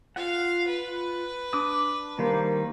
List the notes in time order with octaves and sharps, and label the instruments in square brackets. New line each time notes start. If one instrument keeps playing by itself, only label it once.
[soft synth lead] F4 [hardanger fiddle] F5 [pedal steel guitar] F#5
[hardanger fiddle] B4
[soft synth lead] D4 [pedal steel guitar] D6 D#6
[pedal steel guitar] D#3 G3 C5 [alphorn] A#3